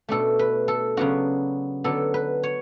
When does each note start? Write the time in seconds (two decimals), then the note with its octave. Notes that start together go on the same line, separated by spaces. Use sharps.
0.08 B2 A3 D4 A4
0.39 B4
0.68 A4
0.97 C#3 F#3 B3 D4 F#4
1.84 D3 F#3 B3 D4 A4
2.14 B4
2.43 C#5